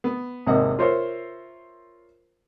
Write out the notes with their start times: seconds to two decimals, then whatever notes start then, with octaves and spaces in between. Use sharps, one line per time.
0.04 B3
0.46 G#1 E2 C3 A#3 D#5 F#5
0.79 F4 A#4 C5 C#5 E5